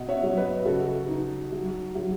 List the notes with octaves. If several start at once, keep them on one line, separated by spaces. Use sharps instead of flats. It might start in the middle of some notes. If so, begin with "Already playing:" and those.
Already playing: B2 D#5 F#5
C#5 E5
F#3
B4 D#5
C#3 F#4 A4
D#4
F#3
F#3